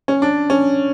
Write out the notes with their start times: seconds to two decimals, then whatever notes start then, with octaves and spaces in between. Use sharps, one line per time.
0.08 C#4
0.22 D4
0.50 C#4